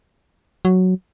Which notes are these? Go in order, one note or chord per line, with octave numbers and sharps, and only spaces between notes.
F#3